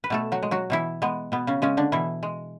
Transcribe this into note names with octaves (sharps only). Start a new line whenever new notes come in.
B4
B2 A3 A4
F#3 F#4
G#3
F#3 F#4
B2 E3 E4
G#3 B3
B2 B3
C#3 C#4
C#3 G#3 C#4
D3 D4
B2 E3 E4
G#3